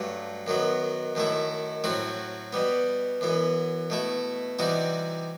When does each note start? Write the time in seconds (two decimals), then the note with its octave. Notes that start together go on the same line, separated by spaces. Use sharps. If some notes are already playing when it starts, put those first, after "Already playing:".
Already playing: G2 F#3 A3
0.47 F#2 D#3 F#3 B3
1.15 F#2 D#3 A3 E4
1.84 A2 F#3 C4 F#4
2.53 B2 G3 B3
3.21 F#2 E3 B3
3.90 B2 A3 E4
4.59 C3 E3 G3 D#4 F#4